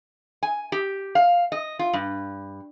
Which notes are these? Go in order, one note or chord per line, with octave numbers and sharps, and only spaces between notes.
G#5
G4
F5
D#5
F4
G2